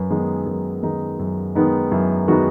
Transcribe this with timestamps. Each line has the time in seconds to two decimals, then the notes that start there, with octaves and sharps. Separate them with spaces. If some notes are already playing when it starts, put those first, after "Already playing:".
Already playing: F#2 B4
0.10 D#3 G#3 B3 D#4
0.47 F#2
0.83 D#3 G#3 B3 D#4
1.19 F#2
1.55 D#3 G#3 B3 D#4
1.92 F#2 E4
2.28 D#3 G#3 B3 D#4 F#4